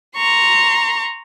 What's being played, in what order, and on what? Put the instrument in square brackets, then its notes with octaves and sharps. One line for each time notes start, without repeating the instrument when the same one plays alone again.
[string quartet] A#5 C6 C#6